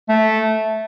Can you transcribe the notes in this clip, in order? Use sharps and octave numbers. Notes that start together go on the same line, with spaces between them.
A3